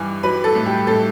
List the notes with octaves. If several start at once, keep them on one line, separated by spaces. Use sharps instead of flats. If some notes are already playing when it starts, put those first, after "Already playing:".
Already playing: G2 E3
F#3 B4
A4
A2
G4
A2 A4